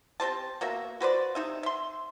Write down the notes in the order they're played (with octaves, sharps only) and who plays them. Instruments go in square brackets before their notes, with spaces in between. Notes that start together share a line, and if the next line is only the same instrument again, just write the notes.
[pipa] C4 G4 C5 A5
B2 A#3 F#4 E5
F#4 B4 C5 D5
C3 D#4 E5
E5 C6